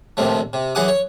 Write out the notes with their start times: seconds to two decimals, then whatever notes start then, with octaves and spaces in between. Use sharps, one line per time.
0.17 A#1 D#2 C3 F3 A3
0.53 C3
0.75 F#2 E3 G#4 F#5 D6 D#6
0.88 C#5